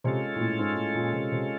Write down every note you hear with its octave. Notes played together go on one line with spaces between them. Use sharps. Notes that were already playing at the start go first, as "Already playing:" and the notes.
C3 G#3 C#4 F4 A4
A#2
A2
G#2
A2
A#2
C3
C3